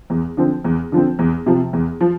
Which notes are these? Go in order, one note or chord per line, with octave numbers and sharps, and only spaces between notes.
E2
D3 F3 C4
E2
D3 F3 C4
E2
C3 F3
E2
F3